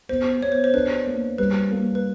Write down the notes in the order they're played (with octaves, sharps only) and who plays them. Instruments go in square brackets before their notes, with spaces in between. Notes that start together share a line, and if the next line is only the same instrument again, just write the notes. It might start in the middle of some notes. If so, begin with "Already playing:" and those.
[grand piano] B3 [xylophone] C5
[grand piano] B3 [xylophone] C#5
[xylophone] C5
C5
[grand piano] D4 [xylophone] B4
[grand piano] A#3
[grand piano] G3 [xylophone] B4
[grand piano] A#3
[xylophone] B4